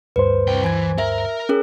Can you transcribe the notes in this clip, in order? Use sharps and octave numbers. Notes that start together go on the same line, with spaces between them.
D2 G2 B4 C5
C2 G5
E3 G#5 G#6
A#4 E5
C#4 G#4 A#4